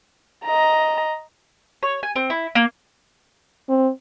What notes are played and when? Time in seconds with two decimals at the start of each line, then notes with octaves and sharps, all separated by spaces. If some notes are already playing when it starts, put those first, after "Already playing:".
0.45 D#5 A#5
1.83 C#5
2.03 G#5
2.16 C4
2.30 E4
2.55 A#3
3.69 C4